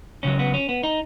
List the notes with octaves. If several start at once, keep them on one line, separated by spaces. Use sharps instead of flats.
C#2 C#3 F#3 C#4
B3
C#4
B3
D#4